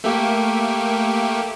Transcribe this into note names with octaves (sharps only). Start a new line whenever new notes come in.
A3 A#3 G4